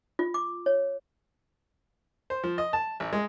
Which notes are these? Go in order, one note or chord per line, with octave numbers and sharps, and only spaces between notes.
F4
D6
C#5
C5
F3
D#5
A5
A1
G#3